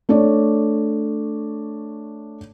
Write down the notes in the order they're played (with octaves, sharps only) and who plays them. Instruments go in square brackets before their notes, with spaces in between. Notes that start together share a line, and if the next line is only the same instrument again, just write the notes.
[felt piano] A3 D4 C#5 D5